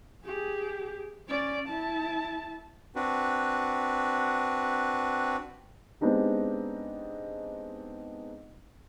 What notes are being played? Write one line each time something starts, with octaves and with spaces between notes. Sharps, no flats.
G4 G#4
C#4 D5
E4 A5
C4 D4 F#4 B4
G#3 B3 C4 D4 D#4 G4